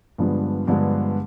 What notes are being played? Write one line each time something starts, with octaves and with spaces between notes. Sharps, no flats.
G2 D3 F3 G#3 B3
G2 D3 F3 G#3 B3